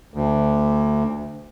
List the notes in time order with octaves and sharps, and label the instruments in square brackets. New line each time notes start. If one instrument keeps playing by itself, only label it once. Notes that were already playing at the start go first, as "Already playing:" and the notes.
[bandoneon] D2